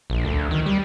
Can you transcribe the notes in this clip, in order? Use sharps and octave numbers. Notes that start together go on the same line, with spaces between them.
A#1
D2
D#3
G3